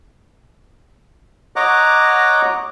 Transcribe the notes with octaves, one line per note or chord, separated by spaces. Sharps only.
C#5 D#5 F#5 A#5 D6